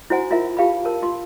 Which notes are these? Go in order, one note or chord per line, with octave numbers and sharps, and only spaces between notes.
E4 F#4 C5 F#5 G#5
E4 F4 A#4 E5
F4 G4 F5 A5 B5
A#4 A5
F4 C6